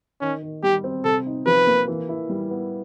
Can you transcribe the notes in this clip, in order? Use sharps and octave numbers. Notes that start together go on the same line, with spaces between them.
D#3 C#4
D#3
G3 G4
C4
C3 A4
D#4
F3 B4
A#3
E3
E4
G3
B3